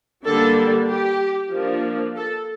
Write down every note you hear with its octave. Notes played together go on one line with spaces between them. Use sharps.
D3 G3 A#3 D4 A4
G4
F3 A#3 D4
A4